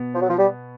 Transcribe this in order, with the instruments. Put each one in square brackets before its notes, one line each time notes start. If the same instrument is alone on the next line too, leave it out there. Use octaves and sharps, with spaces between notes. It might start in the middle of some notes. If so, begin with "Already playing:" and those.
Already playing: [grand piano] B2 B3
[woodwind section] F3
F#3
F3
G3